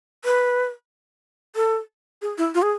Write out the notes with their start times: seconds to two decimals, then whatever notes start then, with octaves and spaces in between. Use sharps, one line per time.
0.25 B4
1.56 A4
2.22 G#4
2.38 E4
2.55 F4
2.62 G#4